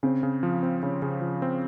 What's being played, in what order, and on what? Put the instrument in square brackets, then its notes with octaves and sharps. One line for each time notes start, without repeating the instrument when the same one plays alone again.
[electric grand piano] C#3 [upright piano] C4
[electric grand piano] C#3
F3
C4
[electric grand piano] C#3 [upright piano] C#4
[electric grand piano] C#3
F3
C4